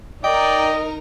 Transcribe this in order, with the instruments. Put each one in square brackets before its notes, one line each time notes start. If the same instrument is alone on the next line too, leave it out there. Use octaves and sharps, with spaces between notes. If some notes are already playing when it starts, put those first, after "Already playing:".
[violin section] D#4 A#4 [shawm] D5 [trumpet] D#5 [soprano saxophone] G5